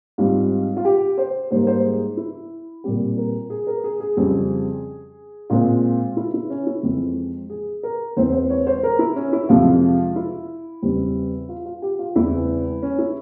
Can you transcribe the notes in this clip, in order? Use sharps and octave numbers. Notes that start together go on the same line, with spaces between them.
G#2 G3 C4 F4
F4
G4
C5
G#2 G3 A#3 C5
C5
G#4
E4
A#2 G3 C4 G4
A#4
G#4
A#4
G#4
G#4
F2 C#3 G3 C4
A#2 G#3 C4 F4
E4
E4
C#4
E4
F2 E3 G#3 C4
G#4
A#4
E2 E3 G#3 C4 C5
C5
C#5
C5
A#4
E4
C#4
E4
F2 C3 F3 G#3 F4
E4
E2 C#3 G3 C4
F4
F4
G4
F4
E2 C#3 E3 G#3 C4 E4
C#4
E4